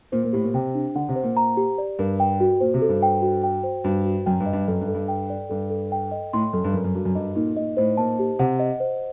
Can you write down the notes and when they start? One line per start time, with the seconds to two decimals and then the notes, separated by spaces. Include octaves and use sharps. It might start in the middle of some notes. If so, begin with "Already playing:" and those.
0.12 A#2 C5
0.24 A#2
0.33 A2 G4
0.44 A#2
0.54 C3 G5
0.75 D4
0.95 D3 F#5
1.09 C3
1.16 C5
1.23 A#2
1.37 A#5
1.57 G4
1.78 D5
1.99 G2 A#4
2.20 G5
2.40 F#4
2.60 A#2 C5
2.74 C3
2.82 A4
2.89 G2
3.03 G5
3.22 F#4
3.44 G5
3.64 C5
3.84 G2 F#4
4.06 F#4
4.26 F#2 G5
4.40 G2
4.46 D#5
4.53 G2
4.68 F#2 A4
4.81 G2
4.88 A4
4.94 G2
5.08 G5
5.30 D5
5.50 G2 A4
5.70 A4
5.92 G5
6.12 D#5
6.33 A2 C6
6.53 F#2 A4
6.64 G2
6.74 F#2 A#4
6.84 F#2
6.94 G2 F#4
7.05 F#2
7.15 G2 D#5
7.36 A#2 D#4
7.56 A#2 D#5
7.77 A2 C5
7.98 A#2 A5
8.19 G4
8.39 C3 F#5
8.60 D#5
8.80 C5